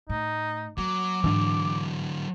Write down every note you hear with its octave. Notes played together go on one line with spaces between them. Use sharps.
A2 D#4
F#3 A#3 D6
G#2 D3 E3 F#3 D4